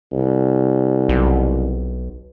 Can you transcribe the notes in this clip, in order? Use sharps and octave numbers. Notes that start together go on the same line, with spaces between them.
C2
B1